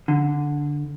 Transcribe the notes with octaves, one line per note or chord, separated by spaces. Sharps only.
D3